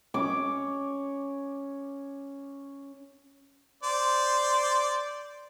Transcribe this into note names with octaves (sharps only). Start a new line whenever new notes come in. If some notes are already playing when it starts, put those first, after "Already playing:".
C#4 C#5 D6
C5 D5